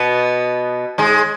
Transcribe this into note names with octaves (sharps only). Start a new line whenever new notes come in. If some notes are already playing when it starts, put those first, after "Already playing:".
Already playing: B2 B3
G#2 G#3